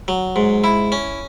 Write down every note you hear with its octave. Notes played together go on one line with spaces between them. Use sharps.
F#3
G#2
E4
C#4